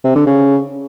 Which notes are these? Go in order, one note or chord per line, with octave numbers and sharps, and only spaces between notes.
C3
D3
C#3